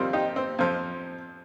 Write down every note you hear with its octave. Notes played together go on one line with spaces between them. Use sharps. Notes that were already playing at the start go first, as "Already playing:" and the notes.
Already playing: F2 D#3 G3 C4 F4
D#4 G4
C4
F2 F3